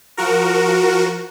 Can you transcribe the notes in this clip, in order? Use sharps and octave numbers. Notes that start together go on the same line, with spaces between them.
F3 F#4 A#4